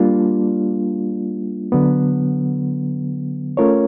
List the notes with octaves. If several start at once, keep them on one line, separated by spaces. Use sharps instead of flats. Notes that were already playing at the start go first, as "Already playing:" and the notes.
Already playing: G3 A#3 D4 F4
D3 F#3 B3
A3 C#4 F4 A#4 C#5